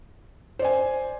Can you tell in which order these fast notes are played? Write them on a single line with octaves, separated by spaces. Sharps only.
C5 D5 G#5